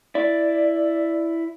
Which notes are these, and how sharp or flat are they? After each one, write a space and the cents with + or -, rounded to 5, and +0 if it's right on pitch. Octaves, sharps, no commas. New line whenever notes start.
E4 +5 D5 +0